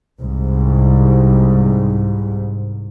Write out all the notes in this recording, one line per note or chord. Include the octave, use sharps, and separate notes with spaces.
C2 G#2